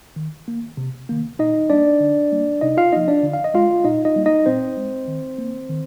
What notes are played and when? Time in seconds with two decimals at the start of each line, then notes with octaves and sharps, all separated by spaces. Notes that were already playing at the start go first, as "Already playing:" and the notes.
0.16 D#3
0.48 A#3
0.77 C3
1.09 D#3 A#3
1.39 A#2 D#4 D#5
1.70 G3 A#3 D4 D5
2.00 D3
2.32 G3 A#3
2.61 C3 D#4 D#5
2.77 F4 F5
2.92 F3 A#3 D#4 D#5
3.08 D4 D5
3.23 D3
3.34 F5
3.44 D#5
3.54 G#3 F4 F5
3.84 A#2 D#4 D#5
4.05 D#4 D#5
4.16 G3 A#3
4.26 D#4 D#5
4.46 A#2 C4 C5
4.77 G#3
5.08 D#3
5.38 A#3
5.69 D#3